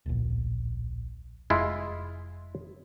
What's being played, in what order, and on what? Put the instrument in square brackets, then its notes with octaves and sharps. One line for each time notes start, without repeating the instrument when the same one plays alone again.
[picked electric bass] D1 A#1
[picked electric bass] F1 [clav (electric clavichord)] G#3 E4 F4